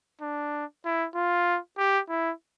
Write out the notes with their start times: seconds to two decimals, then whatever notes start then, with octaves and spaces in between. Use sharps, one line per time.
0.21 D4
0.85 E4
1.15 F4
1.78 G4
2.09 E4